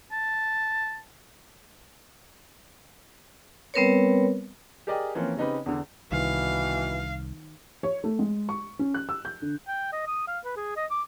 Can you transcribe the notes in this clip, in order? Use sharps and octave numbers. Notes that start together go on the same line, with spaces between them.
A5
G3 B3 C4 A#4 B4 C#5
G4 G#4 A#4 D5 D#5 G5
E3 F3 A#3 C4 C#4 F4
C#3 C4 D#4 G4 B4
E2 D3
C2 B2 D#3 E3 F5
C#5
A3
G#3
C#6
C#4
F#6
E6
G6
D3
G5
D#5
D#6
F5
B4
G#4
D#5
D6